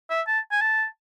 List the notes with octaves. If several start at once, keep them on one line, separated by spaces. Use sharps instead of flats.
E5
A5
G#5
A5